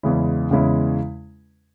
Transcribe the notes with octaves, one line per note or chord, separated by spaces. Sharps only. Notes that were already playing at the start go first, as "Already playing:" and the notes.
E2 C#3 G#3 C#4 E4
E2 C#3 G#3 C#4 E4